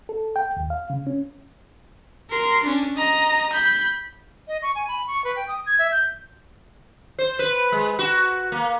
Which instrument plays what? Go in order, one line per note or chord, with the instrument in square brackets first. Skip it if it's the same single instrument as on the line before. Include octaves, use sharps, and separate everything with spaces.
[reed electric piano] A4
G5
D#2
F5
C#3
C#4
[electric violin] A#4 C6
C#4 D4
D#5 A#5
B5 G6
[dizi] D#5
C#6
G#5
B5
C#6
B4
G5
D#6
G#6
E5
G6
[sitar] C5
B4
G#3
F#4
A#3